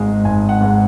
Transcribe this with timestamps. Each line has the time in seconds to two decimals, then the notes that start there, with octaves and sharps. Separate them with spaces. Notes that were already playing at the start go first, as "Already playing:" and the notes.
Already playing: G#1 G#2 G#3
0.25 G#1 G#5
0.49 F#5
0.61 G#2 G#3